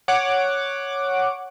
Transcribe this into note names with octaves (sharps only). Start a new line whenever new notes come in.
C#5 F#5 D6